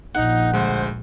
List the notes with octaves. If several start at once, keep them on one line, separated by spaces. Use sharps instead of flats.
A#1 D#4 F#5
D2 G#3 C5